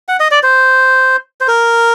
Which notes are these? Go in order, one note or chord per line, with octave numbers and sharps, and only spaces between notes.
F#5
D#5
D5
C5
C5
A#4